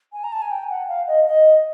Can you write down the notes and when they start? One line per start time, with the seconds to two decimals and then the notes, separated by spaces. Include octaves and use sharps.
0.13 G#5
0.24 A#5
0.32 A5
0.42 G#5
0.51 G5
0.70 F#5
0.88 F5
1.07 D#5
1.27 D#5